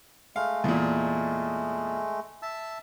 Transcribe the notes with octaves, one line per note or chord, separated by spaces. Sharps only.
G#3 A3 F5
E2 A#2
E5 A5 E6